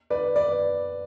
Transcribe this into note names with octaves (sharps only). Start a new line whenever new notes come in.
B4 D5
B4 D5